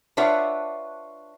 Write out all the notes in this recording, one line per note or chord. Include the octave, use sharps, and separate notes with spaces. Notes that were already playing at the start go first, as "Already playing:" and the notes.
D4 F4 B4 C#5 E5 F#5